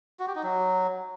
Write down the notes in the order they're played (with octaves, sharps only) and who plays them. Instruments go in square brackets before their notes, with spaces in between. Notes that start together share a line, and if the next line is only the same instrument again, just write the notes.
[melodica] F#4
G4
D#4
F#3